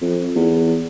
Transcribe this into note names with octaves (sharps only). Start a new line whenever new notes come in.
F2
E2